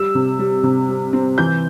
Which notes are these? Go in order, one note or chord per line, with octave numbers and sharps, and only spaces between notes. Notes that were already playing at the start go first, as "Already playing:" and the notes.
Already playing: G3 E6
C3
G3
C3
G3
C4
E3 G6